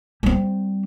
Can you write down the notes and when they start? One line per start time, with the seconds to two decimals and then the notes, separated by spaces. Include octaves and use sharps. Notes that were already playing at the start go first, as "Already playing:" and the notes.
0.23 G3 C4